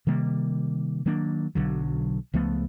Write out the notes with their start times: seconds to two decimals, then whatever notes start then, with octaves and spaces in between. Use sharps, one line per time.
0.07 C3 D#3 G3 A#3
1.06 D#3 F#3 A#3 D4
1.55 B1 D3 F#3
2.34 C#2 F3 A3 B3